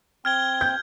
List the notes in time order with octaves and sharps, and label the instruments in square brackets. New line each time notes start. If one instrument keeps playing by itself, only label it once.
[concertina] C4 [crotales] F6 G#6 G7
[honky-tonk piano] G6